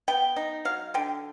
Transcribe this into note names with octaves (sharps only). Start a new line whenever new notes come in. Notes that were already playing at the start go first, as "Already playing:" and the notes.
B3 G5
D#4
F#3 F5
D3 G5